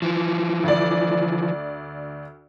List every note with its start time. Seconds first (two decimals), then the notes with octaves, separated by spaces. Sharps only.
0.02 E3 F3
0.63 D2 D5